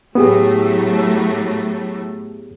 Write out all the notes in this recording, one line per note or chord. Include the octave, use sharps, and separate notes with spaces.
A2 F#3 A3 B3 G4 G#4